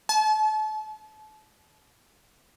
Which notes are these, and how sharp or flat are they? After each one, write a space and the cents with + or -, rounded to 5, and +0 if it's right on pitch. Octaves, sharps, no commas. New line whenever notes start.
A5 -35